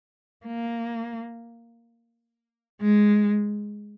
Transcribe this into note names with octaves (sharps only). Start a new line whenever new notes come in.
A#3
G#3